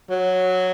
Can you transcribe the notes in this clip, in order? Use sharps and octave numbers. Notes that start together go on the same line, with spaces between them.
F#3